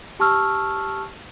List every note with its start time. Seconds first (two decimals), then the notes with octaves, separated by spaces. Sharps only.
0.20 G4 A5 C#6 E6 F6